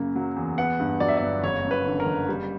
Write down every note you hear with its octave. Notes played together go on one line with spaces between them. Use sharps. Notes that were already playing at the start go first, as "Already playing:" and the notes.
Already playing: F#2 C#3 A#3
F#3
E2
B3 F#5
G2
F#3 D5
E5
G1 D5
F#1 C#5
F#2
B4
D3
A#4
F#1
G3